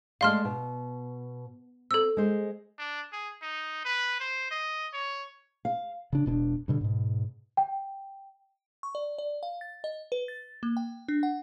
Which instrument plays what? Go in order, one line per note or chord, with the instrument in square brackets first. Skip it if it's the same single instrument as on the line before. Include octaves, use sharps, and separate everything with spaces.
[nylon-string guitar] G#3 A3 D5 [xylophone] F5 C6 F6
[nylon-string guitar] B2
[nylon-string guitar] C4 [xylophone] A4 E6
[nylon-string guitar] G#3 C5
[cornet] D4
G#4
D#4
B4
C5
D#5
C#5
[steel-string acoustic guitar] F5
[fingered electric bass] C#3 D4
E1 B2 D4
G2 B2 D3
G#2 B2
[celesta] G5
[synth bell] C#6
D5
D5
F5
A6
D#5
B4
A6
A#3
G5
D4
F#5